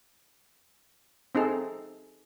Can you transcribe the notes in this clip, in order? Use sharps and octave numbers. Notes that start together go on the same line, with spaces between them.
C4 D#4 G#4 A4